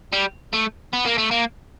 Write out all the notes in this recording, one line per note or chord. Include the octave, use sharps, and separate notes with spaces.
G3
A3
B3
A#3
A3
A#3